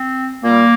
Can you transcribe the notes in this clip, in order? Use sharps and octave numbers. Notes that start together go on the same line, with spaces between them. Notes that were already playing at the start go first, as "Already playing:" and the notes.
Already playing: C4
A#2 G3 A#3